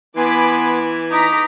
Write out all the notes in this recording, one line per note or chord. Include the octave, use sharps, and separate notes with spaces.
E3 B3 G#5 B5 C6 D6
D#4 A#5 D6 B6